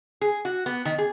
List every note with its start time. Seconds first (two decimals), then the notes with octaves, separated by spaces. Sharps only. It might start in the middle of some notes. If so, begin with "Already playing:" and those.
0.21 G#4
0.45 F#4
0.66 B3
0.85 D#3
0.98 G#4